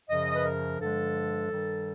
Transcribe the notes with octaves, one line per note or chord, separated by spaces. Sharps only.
F#2 C#3 F3 D#5
B4
A#4
G2 D3 F3 G#3 A4
G2 D#3 G3